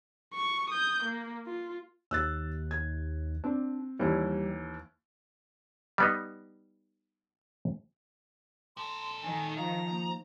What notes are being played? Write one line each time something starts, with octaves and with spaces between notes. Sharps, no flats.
C#6
D#6 G6
A#3
F4
D#2 E6 F#6 A6
G#6
C4 D4
D#2 E3 G3 E4
G3 B3 D#4
A#2 A4 C6
D#3 G#5
F3 F5 A#5
A#3